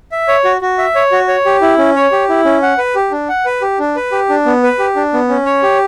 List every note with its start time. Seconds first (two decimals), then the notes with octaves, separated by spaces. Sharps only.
0.12 E5
0.28 C#5
0.44 F#4
0.61 F#4
0.78 E5
0.95 C#5
1.12 F#4
1.28 C#5
1.45 G4
1.62 E4
1.78 C#4
1.96 C#5
2.12 G4
2.29 E4
2.45 C#4
2.62 F#5
2.78 B4
2.95 G4
3.11 D4
3.29 F#5
3.45 B4
3.62 G4
3.79 D4
3.96 B4
4.12 G4
4.29 D4
4.46 B3
4.63 B4
4.79 G4
4.96 D4
5.13 B3
5.29 C#4
5.46 C#5
5.63 G4